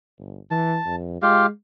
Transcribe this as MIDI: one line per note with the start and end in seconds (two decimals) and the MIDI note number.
0.19 0.38 31
0.51 0.78 52
0.51 0.96 81
0.86 1.20 41
1.22 1.49 56
1.22 1.46 65
1.22 1.46 67
1.22 1.46 77